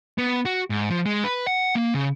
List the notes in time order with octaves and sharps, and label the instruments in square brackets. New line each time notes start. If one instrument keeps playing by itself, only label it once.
[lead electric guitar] B3
F#4
G#2
F3
G#3
B4
F#5
A#3
C#3